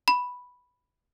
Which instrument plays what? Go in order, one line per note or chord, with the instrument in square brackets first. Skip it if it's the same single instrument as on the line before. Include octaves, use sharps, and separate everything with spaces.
[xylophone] B5